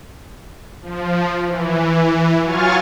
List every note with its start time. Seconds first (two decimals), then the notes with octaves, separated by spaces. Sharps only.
0.82 F3
1.45 E3
2.42 F#3 F4 G#5 C#6 F6 A6